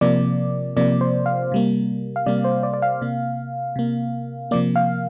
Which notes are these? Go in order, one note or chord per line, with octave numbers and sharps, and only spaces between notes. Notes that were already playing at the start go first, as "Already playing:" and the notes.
C3 F3 A#3 D5
C3 F3 A#3 D5
C5
F5
C3 G3 A#3
F5
C3 G3 A#3 D5
C5
D5
D5
F5
C3 A#3
C3 A#3
C3 F3 A#3 D5
F5